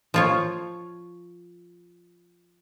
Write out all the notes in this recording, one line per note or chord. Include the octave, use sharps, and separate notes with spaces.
F3 F4 C#5